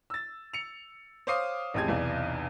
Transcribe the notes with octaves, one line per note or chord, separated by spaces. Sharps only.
E6 A6
C#7 F7
C5 C#5 F5 D6 D#6 C7
A1 F2 G4 G#4 G#6
B1 E2 C3 D5